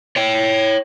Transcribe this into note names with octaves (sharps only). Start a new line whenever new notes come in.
C#5 G5